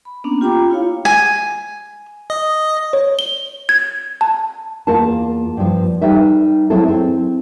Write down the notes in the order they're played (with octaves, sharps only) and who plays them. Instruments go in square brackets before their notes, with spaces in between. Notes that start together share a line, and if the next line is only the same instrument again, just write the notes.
[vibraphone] B5
A#3 B3 C#4 D4
F4 G4 G5 A#5 B5 D6
E4 F4 C#5 F5
[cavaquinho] G#5
[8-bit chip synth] D#5
[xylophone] C#5
G7
G#6
A5
[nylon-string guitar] E2 A#3 F4 A#4 A5
G2 F3
G3 D#4 A4 B4 E5
F#3 G#3 C4 E4 A4
C4 E4